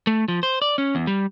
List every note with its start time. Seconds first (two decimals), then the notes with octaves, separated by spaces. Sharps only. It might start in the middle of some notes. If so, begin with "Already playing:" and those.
0.07 A3
0.28 F3
0.43 C5
0.62 D5
0.78 C#4
0.95 E2
1.07 G3